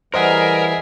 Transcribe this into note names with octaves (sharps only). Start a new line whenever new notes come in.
E3 G3 G#4 A#4 C5 D#5 E5 F#5